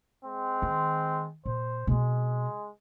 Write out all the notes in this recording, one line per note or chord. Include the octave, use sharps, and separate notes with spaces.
G#3 C4
D#3
A#2 C5
B2 G#3 C4